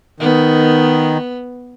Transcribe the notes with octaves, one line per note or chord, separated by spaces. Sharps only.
D#3 B3